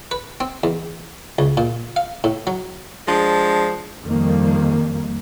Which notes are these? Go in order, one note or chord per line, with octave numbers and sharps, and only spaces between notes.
B4
C4
E2
C#2
A#2
F5
A2
F#3
F3 G#3 D4
F2 D#3 G3 A#3